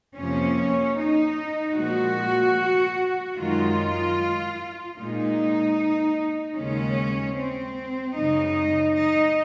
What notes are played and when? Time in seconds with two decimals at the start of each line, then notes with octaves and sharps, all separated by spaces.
0.17 F2 C3 F3 A#3 C#4
0.98 D#4
1.77 A#2 F3 G#3 F#4
3.37 F#2 D#3 G#3 F4
4.98 A#2 G#3 D#4
6.57 D#2 C#3 G#3 C#4
7.37 C4
8.17 F#2 C#3 G#3 D#4
8.97 D#4